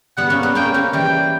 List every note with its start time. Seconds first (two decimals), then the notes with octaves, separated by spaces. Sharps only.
0.17 G3 B3 F#5
0.30 A#3 C#4
0.43 G3 B3
0.55 A#3 C#4 G5
0.74 A#3 C#4
0.93 E3 G3 G5